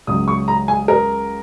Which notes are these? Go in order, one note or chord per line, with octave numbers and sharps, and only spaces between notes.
C#2 C#3 F#3 D#6
C#6
A#5
G#5
A#4